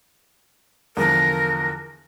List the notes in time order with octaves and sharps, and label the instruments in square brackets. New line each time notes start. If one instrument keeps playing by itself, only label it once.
[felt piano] E2 D3 F3 [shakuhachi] A#4